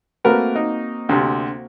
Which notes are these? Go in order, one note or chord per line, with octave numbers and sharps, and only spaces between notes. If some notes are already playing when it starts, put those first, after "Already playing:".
A3 A#3 C4 F#4 A#4 B4
D#4
D2 C3